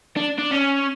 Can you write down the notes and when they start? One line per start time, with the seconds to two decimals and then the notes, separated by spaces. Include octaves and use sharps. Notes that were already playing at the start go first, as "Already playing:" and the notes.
0.16 D4
0.39 D4
0.52 C#4